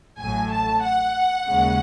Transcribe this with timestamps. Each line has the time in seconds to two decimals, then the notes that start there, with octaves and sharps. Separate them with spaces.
0.19 A1 A2 F#3 A3 G#5
0.51 A5
0.84 F#5
1.48 D#2 C#3 G#3